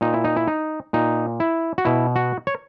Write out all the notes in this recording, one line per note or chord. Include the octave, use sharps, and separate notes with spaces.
A#2 D#4
E4
D#4
E4
D#4
A#2 D#4
E4
F#4
B2 E4
F#4
C#5